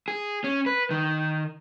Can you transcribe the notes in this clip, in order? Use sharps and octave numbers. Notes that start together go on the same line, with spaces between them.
G#4
C#4
B4
D#3